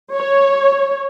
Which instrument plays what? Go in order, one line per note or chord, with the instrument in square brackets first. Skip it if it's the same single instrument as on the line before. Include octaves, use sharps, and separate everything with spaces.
[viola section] C#5